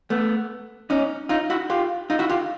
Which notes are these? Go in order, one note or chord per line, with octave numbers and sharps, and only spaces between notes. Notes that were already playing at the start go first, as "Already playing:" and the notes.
A3 B3
C#4 D#4
D#4 F4
E4 F#4
F4 G4
D#4 F4
E4 F#4
F4 G4